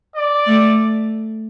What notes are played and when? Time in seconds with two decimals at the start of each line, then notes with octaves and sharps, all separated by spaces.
0.16 D5
0.46 A3